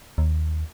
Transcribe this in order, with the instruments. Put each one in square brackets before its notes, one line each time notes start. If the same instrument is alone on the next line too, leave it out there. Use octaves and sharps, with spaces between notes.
[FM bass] D#2